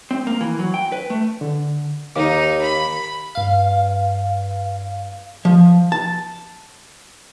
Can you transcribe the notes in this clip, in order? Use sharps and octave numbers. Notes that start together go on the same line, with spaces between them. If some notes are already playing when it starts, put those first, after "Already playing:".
C4
A#3
E3
F#3
G5
B4
A3
D3
D#2 D#3 D#4 F5 D6
B5
G2 F5
F3
A5